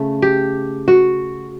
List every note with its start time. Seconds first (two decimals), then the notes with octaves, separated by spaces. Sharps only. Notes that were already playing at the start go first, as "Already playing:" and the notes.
Already playing: C#3 A3
0.22 G4
0.88 F#4